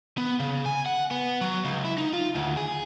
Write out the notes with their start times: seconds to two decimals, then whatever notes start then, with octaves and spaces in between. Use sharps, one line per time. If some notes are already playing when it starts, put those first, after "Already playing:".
0.18 B3
0.40 C#3
0.66 G#5
0.86 F#5
1.11 B3
1.41 F#3
1.65 C#2
1.85 E4
1.98 D#4
2.13 F4
2.35 D2
2.57 G#4